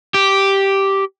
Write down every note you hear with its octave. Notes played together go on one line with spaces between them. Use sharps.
G4